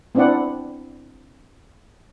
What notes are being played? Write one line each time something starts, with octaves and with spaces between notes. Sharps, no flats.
B3 C4 D4 E4 D5 F#5